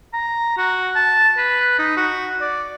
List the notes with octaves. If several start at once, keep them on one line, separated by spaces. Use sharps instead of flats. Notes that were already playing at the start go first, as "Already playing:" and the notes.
A#5
F#4
A5
B4
D#4
F#4
D5